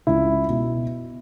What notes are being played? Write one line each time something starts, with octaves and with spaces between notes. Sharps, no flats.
C#2 E4
B2